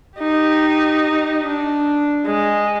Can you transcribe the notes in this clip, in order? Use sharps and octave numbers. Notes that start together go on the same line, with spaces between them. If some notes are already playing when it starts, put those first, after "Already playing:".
D#4 G4
D4
G#3